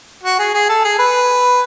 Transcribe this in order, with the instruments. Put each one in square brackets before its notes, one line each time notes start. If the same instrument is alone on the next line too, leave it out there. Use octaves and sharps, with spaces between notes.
[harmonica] F#4
G#4
G#4
A4
G#4
B4